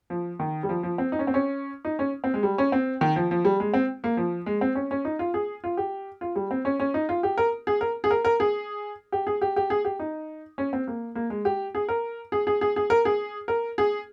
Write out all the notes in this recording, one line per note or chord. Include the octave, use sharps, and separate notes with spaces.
F3
D#3
G3
F3
F3
C4
D#4
C#4
C4
C#4
D#4
C#4
C4
G#3
G3
C#4
C4
D#3
F3
F3
G3
G#3
C4
A#3
F3
G#3
C4
C#4
C#4
D#4
F4
G#4
F4
G4
F4
G3
C4
C#4
C#4
D#4
F4
G4
A#4
G#4
A#4
G#4
A#4
A#4
G#4
G4
G#4
G4
G4
G#4
G4
D#4
C#4
C4
A#3
A#3
G#3
G4
G#4
A#4
G#4
G#4
G#4
G#4
A#4
G#4
A#4
G#4